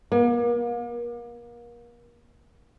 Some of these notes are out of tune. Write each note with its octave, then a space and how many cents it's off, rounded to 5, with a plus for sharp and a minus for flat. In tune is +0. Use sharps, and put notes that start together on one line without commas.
A#3 +35